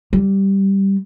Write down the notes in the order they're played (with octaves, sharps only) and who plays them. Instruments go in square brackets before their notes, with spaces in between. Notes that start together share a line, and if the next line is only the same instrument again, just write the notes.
[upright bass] G3